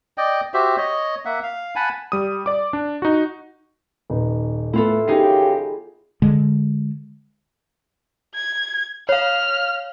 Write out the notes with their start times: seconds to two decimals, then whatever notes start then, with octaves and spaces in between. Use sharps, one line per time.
0.18 D5 D#5 G5
0.54 F#4 G4 C5 E5
0.78 C#5 D#5
1.25 A#3 E5 F#5
1.43 F5
1.76 F#5 G#5 A5 B5
2.12 G3 D#6
2.46 D5 D6
2.73 D4
3.02 D#4 F#4
4.10 D#1 D#4 B4
4.73 A2 B3 E4 F4 A4
5.08 F#2 C#3 B3 D#4 G4 G#4 C7
6.22 D3 G#3
8.35 G#6
9.09 C#5 F5 F6